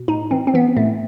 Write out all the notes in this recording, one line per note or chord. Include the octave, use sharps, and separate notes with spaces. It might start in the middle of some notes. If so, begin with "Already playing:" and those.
Already playing: B2
A2 D#4
E3 C4
C4
E3 B3
A2 A3